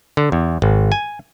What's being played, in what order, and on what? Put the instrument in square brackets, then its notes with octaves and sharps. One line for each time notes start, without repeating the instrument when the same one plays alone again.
[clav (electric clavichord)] D3
E2
G#1
G#5